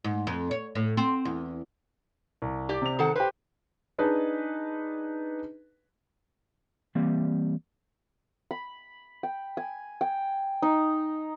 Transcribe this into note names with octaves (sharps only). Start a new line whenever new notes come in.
G#2
F2
C#5
A2
C4
E2
C2
G4 D5
C3 F7
D#3 A4 F#5
G4 B4 C5
D4 D#4 G#4 B4 D#5 A5
E3 G3 A#3 C4
B5
G5
G#5
G5
D#4